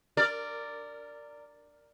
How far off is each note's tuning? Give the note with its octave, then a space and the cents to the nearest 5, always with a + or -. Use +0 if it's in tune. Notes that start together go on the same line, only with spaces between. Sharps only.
A#4 -15 D5 +0